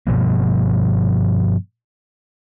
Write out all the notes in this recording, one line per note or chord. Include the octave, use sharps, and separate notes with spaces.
G2 B2 F3 A#3